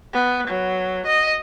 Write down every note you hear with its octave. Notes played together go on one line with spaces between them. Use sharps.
B3
F#3
D#5